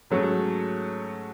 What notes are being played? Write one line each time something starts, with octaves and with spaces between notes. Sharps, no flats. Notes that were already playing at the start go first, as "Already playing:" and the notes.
G#2 F#3 A3 C#4